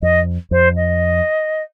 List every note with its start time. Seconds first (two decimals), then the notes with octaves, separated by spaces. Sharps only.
0.02 F2 D#5
0.51 F2 C5
0.76 D#5